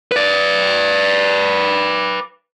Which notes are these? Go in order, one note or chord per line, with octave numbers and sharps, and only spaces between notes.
B4 D5